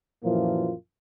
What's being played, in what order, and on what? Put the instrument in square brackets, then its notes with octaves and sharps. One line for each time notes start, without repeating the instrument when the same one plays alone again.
[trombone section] F#2 A#2 E3 F3 A#3 F4